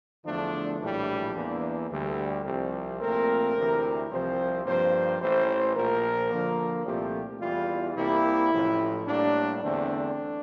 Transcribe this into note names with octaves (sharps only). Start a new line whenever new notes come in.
E2 D3 F3 A3 D4
A#1 A2 E3 G3 D4
E2 E3 A#3
D2 D3 G3
C2 C3 F3 C4
A#1 A#2 A3 C4 A#4
D2 C3 E3
C2 C3 F3 C4 C5
G2 F3 A#3 C5
A1 A2 E3 C5
A#1 A#2 F3 A#4
D2 D3 F3 A#3
C2 A#2 F3 A3 C4 G4
E2 E3 G3 F4
C2 C3 G3 A#3 E4
A1 A2 F3 A3
A2 G3 A#3 D4
E2 D3 A3 C4 D4